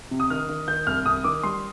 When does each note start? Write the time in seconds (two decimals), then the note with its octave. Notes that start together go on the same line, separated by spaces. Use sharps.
0.11 C3
0.20 D#6
0.30 D#3 F6
0.49 D#3
0.68 D#3 G6
0.87 C2 F6
1.06 C2 D#6
1.24 D#3 D6
1.43 G3 C6